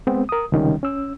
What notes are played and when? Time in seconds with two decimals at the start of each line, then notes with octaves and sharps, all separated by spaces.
0.07 G#3 B3 C4
0.29 A#4 D#6
0.52 C#2 C3 D#3 G3 C#4
0.83 C#4 E6